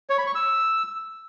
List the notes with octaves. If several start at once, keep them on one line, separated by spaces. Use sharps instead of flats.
C#5
B5
C#6
E6